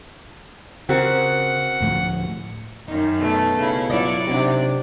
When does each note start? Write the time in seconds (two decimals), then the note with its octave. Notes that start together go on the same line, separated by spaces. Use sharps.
0.89 C#3 C4 F#4 A#4 F#5
1.81 D2 A2 F3
2.88 F#2 D#3 D#4
3.20 B2 A3
3.58 C#3 E4
3.90 F#3 E4 F4 D5 D#5
4.27 C3 D4 D#4 G4